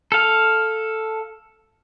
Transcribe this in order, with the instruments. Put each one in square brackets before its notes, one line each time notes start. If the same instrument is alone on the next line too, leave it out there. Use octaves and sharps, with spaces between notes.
[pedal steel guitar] A4 F5